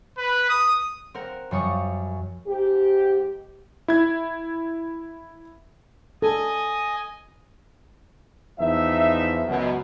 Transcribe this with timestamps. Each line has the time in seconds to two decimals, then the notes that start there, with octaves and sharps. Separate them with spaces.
0.18 B4
0.49 D#6
1.14 C4 A#4 F#5
1.51 F#2 F3 G3 C#6 D#6
2.47 G#2 G4
3.88 E4 G#6
6.22 A4 D#5 G#5
8.59 E2 F3 D#4 E5
9.47 C#2 F#2 B2